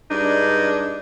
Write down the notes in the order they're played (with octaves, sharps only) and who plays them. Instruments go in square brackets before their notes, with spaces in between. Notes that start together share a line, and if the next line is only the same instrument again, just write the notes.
[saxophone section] G2 G#3 D4 D#4